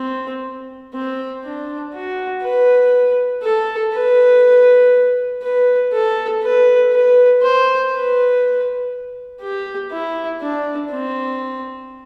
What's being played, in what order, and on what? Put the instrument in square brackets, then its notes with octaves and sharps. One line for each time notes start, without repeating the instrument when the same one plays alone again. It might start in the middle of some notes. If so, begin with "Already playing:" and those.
Already playing: [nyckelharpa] C4
C4
D4
F#4
B4
A4
B4
B4
A4
B4
B4
C5
B4
G4
E4
D4
C4